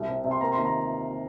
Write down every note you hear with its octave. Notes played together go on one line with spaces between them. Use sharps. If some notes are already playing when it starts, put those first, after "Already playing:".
Already playing: C2
C3
C3
C6
A#3 A#5
D#2 C6
A#5